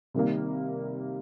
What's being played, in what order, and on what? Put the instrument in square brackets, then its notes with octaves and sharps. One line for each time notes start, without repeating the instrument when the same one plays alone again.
[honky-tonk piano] C3 D#3 G3 A#3